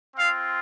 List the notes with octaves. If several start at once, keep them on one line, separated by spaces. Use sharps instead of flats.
C4 F4 F5